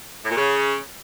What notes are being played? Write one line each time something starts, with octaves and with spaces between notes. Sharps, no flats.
A2
A#2
C#3